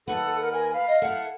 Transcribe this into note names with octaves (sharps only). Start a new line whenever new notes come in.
D#2 A4 B4 F#5
A#4
A#4 G#5
F5 B5
D#5
E4 A4 F#5